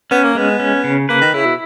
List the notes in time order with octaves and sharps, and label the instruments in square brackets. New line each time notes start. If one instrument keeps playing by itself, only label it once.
[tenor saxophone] B3 [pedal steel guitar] C#4
[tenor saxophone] A#3
[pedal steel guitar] G#3 [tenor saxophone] B3
[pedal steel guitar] C#4
C#3
[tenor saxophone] A#3 [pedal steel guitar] B4
[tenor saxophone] D#3
[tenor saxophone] C#3 [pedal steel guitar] E4
[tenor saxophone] B2